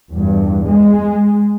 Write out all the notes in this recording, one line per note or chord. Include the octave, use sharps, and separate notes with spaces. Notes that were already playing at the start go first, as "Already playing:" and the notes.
E2 G2
G#3